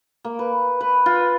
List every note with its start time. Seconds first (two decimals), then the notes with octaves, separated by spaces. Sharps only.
0.24 A#3
0.39 B4
0.80 B4
1.06 F4